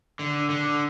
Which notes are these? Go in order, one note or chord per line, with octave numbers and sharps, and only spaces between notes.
D3
D3